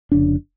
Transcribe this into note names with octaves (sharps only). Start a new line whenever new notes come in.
F1 F2 C#3 D4